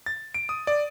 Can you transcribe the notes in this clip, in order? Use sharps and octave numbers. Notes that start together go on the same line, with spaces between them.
A6
D7
D#6
D5